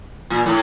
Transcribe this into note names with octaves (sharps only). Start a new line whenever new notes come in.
A#2
A2